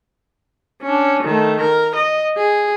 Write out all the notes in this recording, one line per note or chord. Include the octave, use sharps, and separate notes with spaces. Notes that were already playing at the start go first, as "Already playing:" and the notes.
C#4 D4
D#3 A3
A#4
D#5
G#4